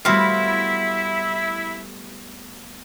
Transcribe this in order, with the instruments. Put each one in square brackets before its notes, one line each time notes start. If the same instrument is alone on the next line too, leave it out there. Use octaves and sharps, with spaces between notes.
[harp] G3 A3 B3 [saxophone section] E4 E5 [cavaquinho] F#4 C5 F5